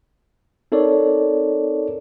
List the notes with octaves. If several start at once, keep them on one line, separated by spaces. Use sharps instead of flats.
C4 D#4 A4 A#4 C#5 D5